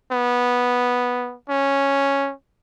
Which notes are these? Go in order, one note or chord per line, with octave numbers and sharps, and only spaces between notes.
B3
C#4